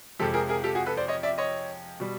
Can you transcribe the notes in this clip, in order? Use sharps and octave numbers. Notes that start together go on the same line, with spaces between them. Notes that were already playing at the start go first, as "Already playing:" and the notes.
F2 C3 F3 G#3 G4 A4
G#4 A#4
G#4 A#4
G4 A4
F#4 G#4
A4 B4
C5 D5
C#5 D#5
D5 E5
C#5 D#5
B2 G3